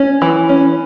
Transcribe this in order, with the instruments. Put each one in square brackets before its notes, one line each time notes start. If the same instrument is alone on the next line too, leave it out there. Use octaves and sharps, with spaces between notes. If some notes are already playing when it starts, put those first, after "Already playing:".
Already playing: [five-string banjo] C#4
E3
C#4